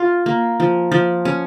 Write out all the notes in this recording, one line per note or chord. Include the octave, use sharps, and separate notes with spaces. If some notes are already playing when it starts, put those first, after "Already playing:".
Already playing: F4
A#3
F3
F3
C#4